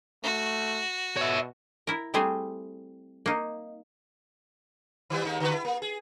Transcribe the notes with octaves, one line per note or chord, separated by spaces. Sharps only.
A3 F#4
B2 C#5 E5
E4 A#4
G3 A3 C4 G#4 C5
A#3 D#4
D#3 G3 B3
D#2 G#3 D#4
D3 F#4 B4
E4
A#3
G#4